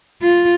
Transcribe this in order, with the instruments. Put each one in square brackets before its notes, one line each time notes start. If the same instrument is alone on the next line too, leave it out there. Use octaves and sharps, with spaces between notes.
[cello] F4